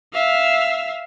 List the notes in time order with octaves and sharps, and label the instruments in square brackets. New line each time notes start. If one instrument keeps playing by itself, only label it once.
[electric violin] E5 F5